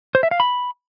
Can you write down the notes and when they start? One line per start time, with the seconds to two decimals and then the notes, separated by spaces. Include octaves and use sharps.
0.15 C5
0.23 E5
0.31 F5
0.40 B5